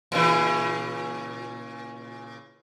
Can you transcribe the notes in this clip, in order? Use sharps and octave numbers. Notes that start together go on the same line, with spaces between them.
A#2 C#3 E3